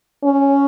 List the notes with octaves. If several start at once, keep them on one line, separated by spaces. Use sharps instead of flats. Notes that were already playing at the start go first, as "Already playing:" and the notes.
C#4